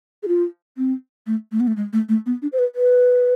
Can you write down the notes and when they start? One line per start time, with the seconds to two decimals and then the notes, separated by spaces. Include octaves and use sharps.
0.23 G#4
0.28 F4
0.77 C4
1.27 A3
1.52 A3
1.60 B3
1.67 A3
1.77 G#3
1.93 A3
2.09 A3
2.26 B3
2.42 D4
2.53 C5
2.59 B4
2.75 B4